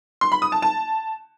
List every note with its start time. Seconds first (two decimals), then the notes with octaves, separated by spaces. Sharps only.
0.21 C6
0.32 B5
0.42 D#6
0.52 A5
0.62 A5